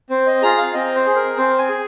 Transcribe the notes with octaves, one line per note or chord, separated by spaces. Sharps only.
C4 C5
D#5
F4 G#4 A#5
F5
C4 D#5
C5
G#4
A#4
C4 C5
G#5
G#4